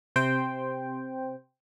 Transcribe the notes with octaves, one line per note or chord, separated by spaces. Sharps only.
C3 C5 G5